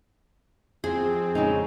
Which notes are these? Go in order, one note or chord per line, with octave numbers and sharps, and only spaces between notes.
F2 C4 G#4
C#3 G#3 D#4